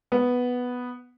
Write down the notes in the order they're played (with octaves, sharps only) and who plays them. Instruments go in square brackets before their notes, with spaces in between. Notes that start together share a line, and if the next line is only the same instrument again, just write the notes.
[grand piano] B3